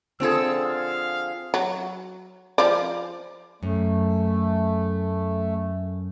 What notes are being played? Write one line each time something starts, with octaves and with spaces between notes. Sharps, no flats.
D3 F3 C4 F4 G#4 A4 E6
F5
F#3
F3 D5
F#2 A3